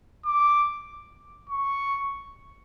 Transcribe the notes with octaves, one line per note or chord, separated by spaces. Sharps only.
D6
C#6